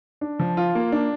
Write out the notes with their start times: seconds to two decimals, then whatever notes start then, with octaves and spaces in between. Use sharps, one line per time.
0.21 D4
0.39 F3
0.57 F4
0.75 A#3
0.92 D4